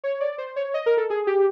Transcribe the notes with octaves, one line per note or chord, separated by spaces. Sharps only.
C#5
D5
C5
C#5
D#5
A#4
A4
G#4
G4